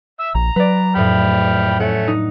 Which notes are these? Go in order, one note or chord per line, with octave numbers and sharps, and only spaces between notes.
E5 E6
A#1 A#5
F#3 B4 D5
F2 A2 G5 B5 F6
A3 C#4 F#5
D#4